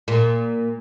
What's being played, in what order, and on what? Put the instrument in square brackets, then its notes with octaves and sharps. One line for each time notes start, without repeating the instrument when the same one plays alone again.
[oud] A#2